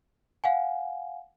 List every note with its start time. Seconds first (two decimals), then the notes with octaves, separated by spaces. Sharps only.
0.44 F5 F#5 G#5